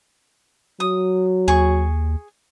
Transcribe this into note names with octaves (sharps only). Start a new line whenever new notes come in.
F#3 D#6
D#2 G#4 C#6